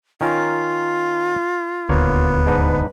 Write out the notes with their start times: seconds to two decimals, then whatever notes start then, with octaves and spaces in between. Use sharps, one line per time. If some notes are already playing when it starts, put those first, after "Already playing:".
0.21 D#3 C#4 F4 A#4
1.89 D#1 D2 A#3 B3 C#5
2.46 G#2 D4 D#4 B4